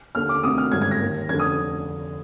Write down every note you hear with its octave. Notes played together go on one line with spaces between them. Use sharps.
D#2 D3 F6
D6
D2 C3 D#3 D#6
F6
G#1 G2 D3 G#6
G#6
A#6
D#2 D#3
F1 D3 G#6
D#6